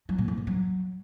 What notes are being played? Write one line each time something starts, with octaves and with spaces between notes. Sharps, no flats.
F#3
A#2
F2
G#2
F#3